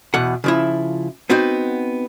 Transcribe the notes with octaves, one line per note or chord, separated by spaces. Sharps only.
E2 B2 F#5
C#3 F3 E4
B3 C4 D#4 F#4